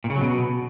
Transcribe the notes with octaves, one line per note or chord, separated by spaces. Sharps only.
A#2
C#3
F#3
B2